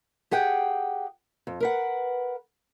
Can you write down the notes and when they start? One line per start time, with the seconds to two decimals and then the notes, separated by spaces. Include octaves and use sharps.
0.31 G4 G#4 F#5 G5
1.47 F2
1.60 A#4 B4 F#5